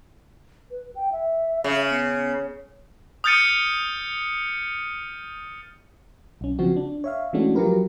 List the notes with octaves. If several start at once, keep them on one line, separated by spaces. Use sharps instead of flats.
B4
G5
E5
C#3
B3
D#6 F6 G6 A6 C#7 D#7
B1 C#4
C#3 F3 C4 F#4
D4
C#5 E5 F5
E3 G#3 A3 C#4 D4 F#4
F3 F#3 F4 G4 A#4 B4